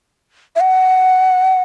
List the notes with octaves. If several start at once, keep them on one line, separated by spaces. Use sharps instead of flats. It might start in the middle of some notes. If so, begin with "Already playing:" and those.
E5
F#5